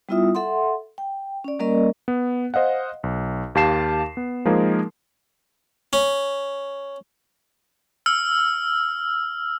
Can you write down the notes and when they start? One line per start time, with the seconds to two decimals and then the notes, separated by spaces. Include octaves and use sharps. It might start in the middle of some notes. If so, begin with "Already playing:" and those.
0.09 G3 B3 E4 F4 E5 D#6
0.35 A4 E5 F#5 C6
0.98 G5
1.44 C#4 D5
1.60 G3 A#3 C#4 A#4 D5 D#5
2.08 B3
2.54 C5 D#5 F5 F#5
3.03 B1
3.55 D#2 G4 F5 A5 C7 E7
4.17 B3
4.45 F3 G#3 A#3 D#4 G#4 A#4
5.93 C#4
8.06 E6 F6